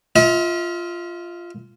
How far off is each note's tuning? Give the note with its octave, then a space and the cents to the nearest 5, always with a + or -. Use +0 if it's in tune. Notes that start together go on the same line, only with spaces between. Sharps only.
F4 -5 E5 -45